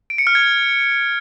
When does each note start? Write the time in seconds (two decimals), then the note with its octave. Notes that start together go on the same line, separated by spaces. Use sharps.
0.10 D7
0.18 C#7
0.27 F6
0.35 G#6